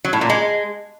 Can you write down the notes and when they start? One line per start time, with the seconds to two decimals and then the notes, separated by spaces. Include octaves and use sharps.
0.05 F#3
0.13 A2
0.21 A#2
0.30 G#3